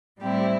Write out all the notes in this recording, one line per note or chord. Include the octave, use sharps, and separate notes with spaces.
A2 G3 C4 E4 G4